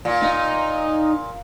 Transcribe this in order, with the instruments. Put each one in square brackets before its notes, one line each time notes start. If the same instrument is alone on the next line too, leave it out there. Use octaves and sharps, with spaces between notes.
[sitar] A#2
[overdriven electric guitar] D#4